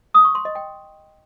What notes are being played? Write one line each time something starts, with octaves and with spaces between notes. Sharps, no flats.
D#6
C#6
C6
D#5
G5